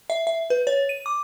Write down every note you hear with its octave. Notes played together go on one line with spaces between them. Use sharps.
E5
E5
B4
C#5
D#7
D6